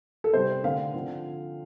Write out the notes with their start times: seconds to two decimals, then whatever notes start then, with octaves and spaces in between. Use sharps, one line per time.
0.24 A4
0.34 C3 G3 C4 C5
0.63 D3 A3 C4 F5
0.94 D3 F3 C4